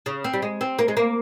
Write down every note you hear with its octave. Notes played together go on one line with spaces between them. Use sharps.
C#3
C4
G3
G#3
C4
A#3
G#3
A#3